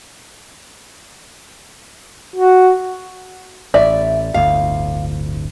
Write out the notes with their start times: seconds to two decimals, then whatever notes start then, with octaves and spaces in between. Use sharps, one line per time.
2.36 F#4
3.74 A1 D5 E5
4.34 D1 G1 D2 F5